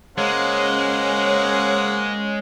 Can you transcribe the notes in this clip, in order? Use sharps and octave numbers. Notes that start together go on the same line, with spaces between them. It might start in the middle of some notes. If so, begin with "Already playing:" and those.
C#3 G#3 A#3 C#4 C5 F#5